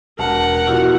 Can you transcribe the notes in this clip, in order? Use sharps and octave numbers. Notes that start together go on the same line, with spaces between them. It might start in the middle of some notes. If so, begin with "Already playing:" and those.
E1 A#4 F#5 A5
B2 F3 E4 F#4 G4